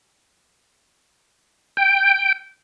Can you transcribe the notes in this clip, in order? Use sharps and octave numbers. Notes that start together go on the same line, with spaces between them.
G5